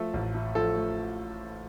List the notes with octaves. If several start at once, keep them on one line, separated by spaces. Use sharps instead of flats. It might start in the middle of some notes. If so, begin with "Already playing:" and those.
Already playing: F3 A3 A4
A1
A2
F3 A4
A3